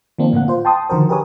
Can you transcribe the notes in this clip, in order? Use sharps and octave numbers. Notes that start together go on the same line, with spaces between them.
D#3 F3 A#3 C4 D4
A2 D3 A#3 F#5
F4 C5
G5 A5 C6 D#6
D3 D#3 F3 F#4 A#4 C5
G4 G#4 A#4 B4 C#5 D#6